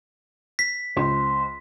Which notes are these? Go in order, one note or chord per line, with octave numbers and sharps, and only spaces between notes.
B6
C#2 C5